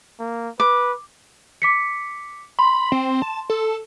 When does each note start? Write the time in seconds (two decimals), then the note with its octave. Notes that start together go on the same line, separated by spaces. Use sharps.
0.19 A#3
0.60 B4 D6
1.62 D6 B6 C#7
2.59 B5 C6
2.92 C4
3.22 A5
3.50 A4